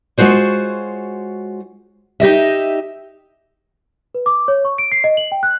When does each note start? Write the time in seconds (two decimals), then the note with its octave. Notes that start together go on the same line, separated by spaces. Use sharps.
0.18 G#3 F4 F#4 C5 C#5
2.20 D#4 G4 D#5 E5
4.15 B4
4.26 D6
4.48 C#5
4.65 C#6
4.78 D7
4.92 C7
5.04 D#5
5.17 F#7
5.32 G5
5.43 F#6